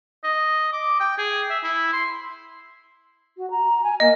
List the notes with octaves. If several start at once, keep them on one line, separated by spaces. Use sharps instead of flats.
D#5
D6
G5
G#4
E5
E4
C6
F#4
A#5
G#5
A#3 D#5